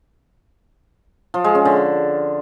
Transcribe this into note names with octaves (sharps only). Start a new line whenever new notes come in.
F3
G#3
C#4
D3